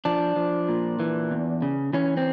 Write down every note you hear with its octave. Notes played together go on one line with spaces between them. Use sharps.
F3 D4
F3
A#2
E3
E2
C#3
E3 C#4
C4